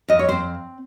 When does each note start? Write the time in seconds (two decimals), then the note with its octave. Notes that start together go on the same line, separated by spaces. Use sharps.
0.08 F2 D#5
0.19 C#5
0.29 C4 C5